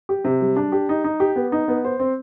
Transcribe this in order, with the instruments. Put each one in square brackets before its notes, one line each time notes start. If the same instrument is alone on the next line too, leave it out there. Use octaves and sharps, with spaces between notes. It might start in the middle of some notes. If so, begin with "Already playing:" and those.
[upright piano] G4
C3
G3
D4
G4
D#4
D#4
G4
B3
D#4
B3
C5
C4